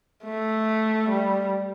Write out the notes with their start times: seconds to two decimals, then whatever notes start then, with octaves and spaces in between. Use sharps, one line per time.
0.24 A3
1.09 G3